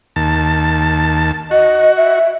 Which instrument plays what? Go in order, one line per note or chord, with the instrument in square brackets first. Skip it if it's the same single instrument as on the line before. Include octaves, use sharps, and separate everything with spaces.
[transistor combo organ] D#2 A5
[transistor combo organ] F#4 [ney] D#5
[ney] E5